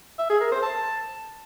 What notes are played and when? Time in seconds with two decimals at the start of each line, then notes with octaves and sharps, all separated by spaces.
0.19 E5
0.30 G#4
0.41 A#4
0.52 C5
0.62 A5